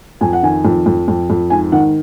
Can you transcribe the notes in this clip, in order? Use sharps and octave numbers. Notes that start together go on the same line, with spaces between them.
F2 G#5
F#5
D#3 G#5
F2
F2
F2
F2
G#2 G#5
D#3 F#5